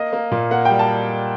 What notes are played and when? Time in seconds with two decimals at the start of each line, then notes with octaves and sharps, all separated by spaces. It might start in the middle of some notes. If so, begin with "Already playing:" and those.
Already playing: A#3 D#5
0.13 A#3
0.31 A#2
0.51 A#3 F#5
0.65 G3 G5
0.79 A5